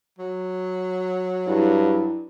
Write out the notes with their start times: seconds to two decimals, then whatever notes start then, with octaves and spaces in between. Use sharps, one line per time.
0.18 F#3
1.48 G2 E4